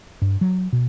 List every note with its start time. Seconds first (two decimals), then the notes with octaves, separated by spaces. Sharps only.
0.22 G2
0.41 F#3
0.73 B2